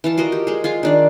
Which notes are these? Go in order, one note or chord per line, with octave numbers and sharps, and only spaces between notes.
E3 F5 A5
F4 F#4 A#4 D#5
G4
G#3 G#4
F4 G#4 F5
D#3 D4 D5